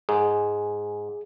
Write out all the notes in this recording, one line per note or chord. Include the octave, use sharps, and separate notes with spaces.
G#2 G#4